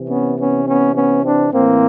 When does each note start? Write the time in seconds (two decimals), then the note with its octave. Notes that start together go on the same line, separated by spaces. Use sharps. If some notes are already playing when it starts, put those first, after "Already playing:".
Already playing: C3 E3
0.09 B3 C#4
0.38 B3 C#4
0.66 B3 C#4
0.95 B3 C#4
1.24 C4 D4
1.52 A2 E3 A#3 C4